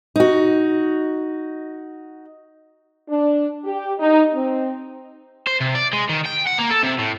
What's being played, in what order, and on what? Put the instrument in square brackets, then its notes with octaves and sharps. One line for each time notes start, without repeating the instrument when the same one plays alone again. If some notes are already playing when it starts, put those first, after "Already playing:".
[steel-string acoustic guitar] D#4 F#4
[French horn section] D4
G4
D#4
C4
[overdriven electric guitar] C5
C3
D5
G#3
D#3
G5
F#5
A#3
A4
C3
A2